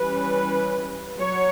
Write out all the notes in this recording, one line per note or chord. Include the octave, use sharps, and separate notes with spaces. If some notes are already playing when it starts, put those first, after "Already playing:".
Already playing: E3 G3 C#4 B4
F#3 C#5